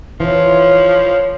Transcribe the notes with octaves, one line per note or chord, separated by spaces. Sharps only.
E3 F3 C#5